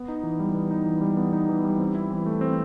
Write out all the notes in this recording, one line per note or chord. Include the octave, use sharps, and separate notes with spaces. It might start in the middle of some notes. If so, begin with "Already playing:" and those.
Already playing: B3
D#4
E3
G3
B3
D#4
E3
G3
B3
D#4
E3
G3
C4
E4
E3
A3
C4